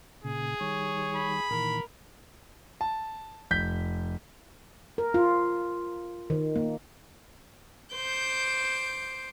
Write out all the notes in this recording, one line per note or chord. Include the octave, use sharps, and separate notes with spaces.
A#2 C#3 G#4
D#3 G3 C#5
B5
A#2 D#3 E3 A#4
A5
F1 G6 B6
A#4
F4
D#3
A#3
C5 D6 G6